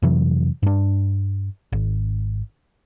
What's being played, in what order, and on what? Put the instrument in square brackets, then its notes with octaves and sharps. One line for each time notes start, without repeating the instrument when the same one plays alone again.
[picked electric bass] F2 C3 E3 F#3
G2 D4
G#1